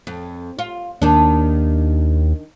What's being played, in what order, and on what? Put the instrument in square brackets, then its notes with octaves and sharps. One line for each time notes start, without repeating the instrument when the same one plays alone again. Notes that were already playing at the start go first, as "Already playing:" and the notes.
[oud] F2
F4
[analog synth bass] D#2 [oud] D#3 D4